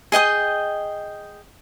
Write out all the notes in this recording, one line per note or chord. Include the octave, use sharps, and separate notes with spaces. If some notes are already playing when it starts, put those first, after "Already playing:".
G#4 D#5 G5 D#6